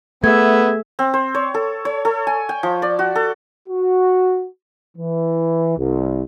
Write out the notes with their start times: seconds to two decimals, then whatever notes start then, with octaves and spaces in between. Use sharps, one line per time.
0.24 A3 B3 G#4 E5 G#6
0.99 C4
1.14 C5
1.35 C#5
1.54 A4
1.85 C#5
2.05 A4
2.27 G#5
2.49 G5
2.63 F3
2.82 D5
2.99 F#4
3.15 A4
3.69 F#4
4.97 E3
5.78 C2